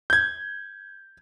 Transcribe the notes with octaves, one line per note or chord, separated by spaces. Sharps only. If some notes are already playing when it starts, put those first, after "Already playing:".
G6 G#6